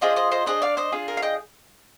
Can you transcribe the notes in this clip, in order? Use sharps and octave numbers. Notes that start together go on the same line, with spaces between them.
D4 F4 G#4 C5 D#5
C5 D#5
C5 D#5
D4 G#4 C5 D#5
D5 F5
C5 D#5
D4 F4 G#4
A#4
F5
D#5 G5